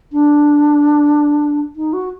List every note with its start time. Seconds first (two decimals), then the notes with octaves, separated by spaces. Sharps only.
0.12 D4
1.76 D#4
1.93 F#4